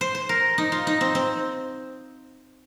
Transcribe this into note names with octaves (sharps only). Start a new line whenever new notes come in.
C5
C5
A#4
D#4
F4
D#4
C4
C4